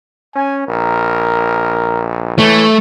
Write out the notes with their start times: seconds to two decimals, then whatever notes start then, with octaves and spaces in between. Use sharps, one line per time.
0.36 C#4 G#5
0.68 A#1 A#4
2.39 E3 A3 C#5